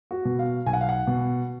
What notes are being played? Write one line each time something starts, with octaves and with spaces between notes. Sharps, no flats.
F#4
B2
F5
B1 G#5
F#5
F5
F#5
B2